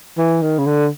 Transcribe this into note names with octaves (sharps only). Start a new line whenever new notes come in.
E3
D#3
C#3
D3